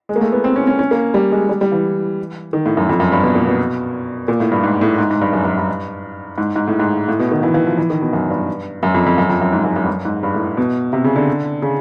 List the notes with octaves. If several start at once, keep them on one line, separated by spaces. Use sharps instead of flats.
G#3
A#3
A3
B3
C4
C#4
C#4
C#4
A#3
G3
G#3
G3
G3
E3
D#3
A2
F#2
F2
F#2
G2
B2
A#2
B2
A#2
A2
G2
G#2
A2
G#2
G#2
G2
F#2
F#2
G2
G#2
G#2
A2
G#2
A2
B2
D#3
E3
E3
F3
E3
D#3
B2
F#2
G2
F#2
F2
F2
F#2
F2
F#2
G#2
F#2
F#2
G2
F#2
G#2
G2
A2
B2
C3
C#3
D3
C#3